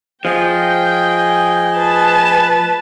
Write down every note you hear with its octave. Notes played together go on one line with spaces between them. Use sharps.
F3 G#4 D#5 G5
B4 A5